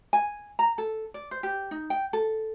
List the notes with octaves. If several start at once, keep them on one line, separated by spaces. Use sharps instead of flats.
G#5
A#5
A4
D5
C5
G4
D#4
G5
A4